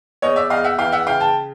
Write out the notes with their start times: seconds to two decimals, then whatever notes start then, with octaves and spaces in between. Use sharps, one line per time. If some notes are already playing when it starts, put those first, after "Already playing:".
0.22 E2 C#5 D#5
0.36 D5 E5
0.50 E2 D#5 F5
0.64 E5 F#5
0.78 E3 F5 G5
0.92 E5 F#5
1.06 C#3 F5 G5
1.20 G5 A5